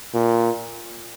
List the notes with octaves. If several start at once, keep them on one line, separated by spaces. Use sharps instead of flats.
A#2